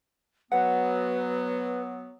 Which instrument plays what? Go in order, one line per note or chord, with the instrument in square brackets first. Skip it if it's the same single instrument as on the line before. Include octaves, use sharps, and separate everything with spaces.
[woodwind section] F#3 B3 [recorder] B4 [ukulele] F#5